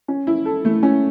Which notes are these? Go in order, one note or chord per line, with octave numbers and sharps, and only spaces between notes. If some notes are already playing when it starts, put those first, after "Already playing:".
C#4
E4
A4
A3
C#4